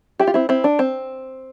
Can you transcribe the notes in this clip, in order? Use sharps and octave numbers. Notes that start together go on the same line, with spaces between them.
E4 G4
F4
C4 E4
C4 E4
D4
C4